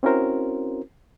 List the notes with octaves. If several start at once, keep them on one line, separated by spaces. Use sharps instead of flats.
C4 C#4 E4 F#4 A#4 C5